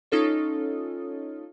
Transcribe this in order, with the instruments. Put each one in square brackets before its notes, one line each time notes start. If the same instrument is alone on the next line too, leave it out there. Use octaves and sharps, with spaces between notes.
[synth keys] C#4 D#4 F4 A4 C#5